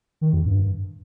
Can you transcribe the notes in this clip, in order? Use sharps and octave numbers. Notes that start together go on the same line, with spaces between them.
D#3
F2
G2